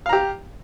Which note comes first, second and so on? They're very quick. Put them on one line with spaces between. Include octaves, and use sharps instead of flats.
F5 A#5 G4